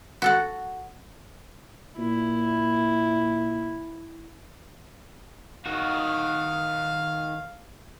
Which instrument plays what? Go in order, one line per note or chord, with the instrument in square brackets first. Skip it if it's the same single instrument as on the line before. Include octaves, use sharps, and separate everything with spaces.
[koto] F#4 A4 F#5
[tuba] A#2 [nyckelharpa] E4
[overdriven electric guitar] D#3 F#4 [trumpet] F5